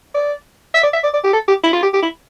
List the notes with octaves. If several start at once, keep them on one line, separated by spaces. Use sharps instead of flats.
D5
E5
D5
E5
D5
D5
G4
A4
G4
E4
F4
G4
G4
E4